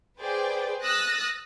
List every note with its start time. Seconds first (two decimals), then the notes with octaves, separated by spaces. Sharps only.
0.18 G#4 B4 C5 D5 G5
0.83 D#6 E6 F#6 A6 A#6